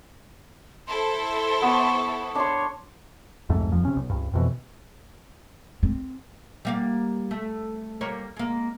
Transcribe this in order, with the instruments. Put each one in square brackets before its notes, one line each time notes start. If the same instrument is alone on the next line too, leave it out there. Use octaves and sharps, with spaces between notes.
[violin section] E4 A4 C5 [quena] C6
[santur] B3 C#5
[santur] D4 C6 [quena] C#5
[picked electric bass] C2 F2 G#2 A3
D#1 F2 F3
C3 C#4
B1
C#2 G2
F2 B2 E3
[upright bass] C4
[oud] G3 A#3 F5
A3
G3 A#3 C#5
G#3 A#3